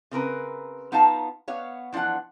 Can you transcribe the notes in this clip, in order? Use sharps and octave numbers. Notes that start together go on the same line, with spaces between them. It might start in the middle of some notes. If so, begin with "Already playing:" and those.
C#3 C4 A#4 B4
B3 D#4 F4 F5 A5 A#5
B3 C#5 F5
E3 F3 D4 F4 F#5